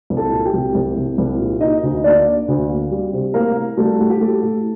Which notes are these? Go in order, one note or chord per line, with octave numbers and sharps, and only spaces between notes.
C2
A4 A5
A#2
G4 G5
C2
C2
C2
C2
A#2
A#3 D#4 D#5
D2
A#3 D4 D5
A#3
D2
A#3
G3
C3
A2 A#3 A#4
A#3
G3 A3 A4
A2 F#4
G4
A3 A#3 A4
A2